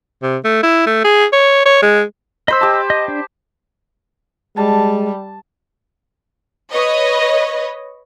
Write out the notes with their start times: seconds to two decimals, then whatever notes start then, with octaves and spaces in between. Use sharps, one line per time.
0.23 C3
0.44 A3
0.63 E4
0.86 A3
1.04 G#4
1.33 C#5
1.66 C#5
1.82 G#3
2.48 C5 D#5 B5 E6
2.61 G4 A5
2.90 D#5
3.08 D4
4.57 G3 G#3 A5
6.73 B4 C#5 D#5